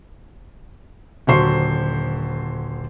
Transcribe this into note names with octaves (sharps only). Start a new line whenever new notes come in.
D#1 D3 F#3 C5 C#6 C7